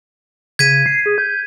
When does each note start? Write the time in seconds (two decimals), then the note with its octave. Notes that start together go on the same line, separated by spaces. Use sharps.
0.59 C#3 G#6 B6 D#7
0.86 C7
1.06 G#4
1.18 G6